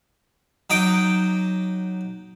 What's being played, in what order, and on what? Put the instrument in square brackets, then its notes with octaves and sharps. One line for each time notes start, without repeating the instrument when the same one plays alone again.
[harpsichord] F#3 D#4 D#5 G5 D6